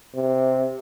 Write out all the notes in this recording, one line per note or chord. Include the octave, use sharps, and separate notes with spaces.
C3